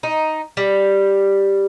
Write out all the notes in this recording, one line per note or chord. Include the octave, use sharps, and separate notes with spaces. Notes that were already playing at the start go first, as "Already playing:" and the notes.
D#4
G3